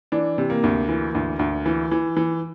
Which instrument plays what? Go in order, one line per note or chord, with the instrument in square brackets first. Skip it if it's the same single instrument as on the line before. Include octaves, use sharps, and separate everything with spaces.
[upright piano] E3 D4
C3
A#3
D2
E3
D2
D2
E3
E3
E3